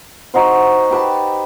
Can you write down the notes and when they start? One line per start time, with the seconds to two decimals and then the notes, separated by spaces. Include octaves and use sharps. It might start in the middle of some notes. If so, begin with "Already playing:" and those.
0.34 D#4 F#4 C5
0.91 G4 B4 A5